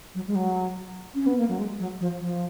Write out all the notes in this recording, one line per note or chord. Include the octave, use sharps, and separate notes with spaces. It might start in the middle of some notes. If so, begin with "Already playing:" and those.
F#3
G#3
F#3
C#4
B3
A#3
F#3
G#3
F#3
F3
F3